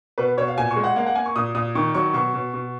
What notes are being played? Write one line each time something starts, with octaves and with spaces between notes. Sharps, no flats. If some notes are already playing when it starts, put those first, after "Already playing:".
B2 B4
B2 C#5
F5
A#2 G#5
C#6
G#3
F#5
A#3 F5
F#5
A#3 G#5
C#6
A#2 D#6
A#2 D#6
D#3 C#6
F#3 C#6
B2 C#6
B2
B2